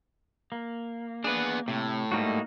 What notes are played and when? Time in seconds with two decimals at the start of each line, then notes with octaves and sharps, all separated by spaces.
0.52 A#3
1.24 B3 D4 G#4 B4
1.68 A2 C3
2.12 G#2 G3 A3 A#3 D#4 F#4